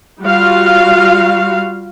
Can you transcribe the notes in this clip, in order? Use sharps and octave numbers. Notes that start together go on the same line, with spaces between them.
G3 F4 F#4 F5